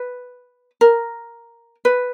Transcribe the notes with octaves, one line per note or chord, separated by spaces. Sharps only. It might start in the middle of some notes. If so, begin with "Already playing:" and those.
Already playing: B4
A#4
B4